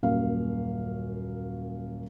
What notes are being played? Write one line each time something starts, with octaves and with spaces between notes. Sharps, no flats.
D#1 F#2 A#3 F5